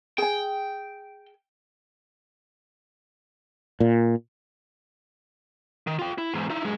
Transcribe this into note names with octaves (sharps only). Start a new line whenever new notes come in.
G#4 G5 G#5
A#2
D#3
F4 G5
E4
E2 G#2
D#4 E4
F#2 G#3